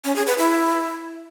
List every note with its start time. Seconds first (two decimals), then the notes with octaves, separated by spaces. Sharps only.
0.05 C#4
0.16 G#4
0.27 B4
0.38 E4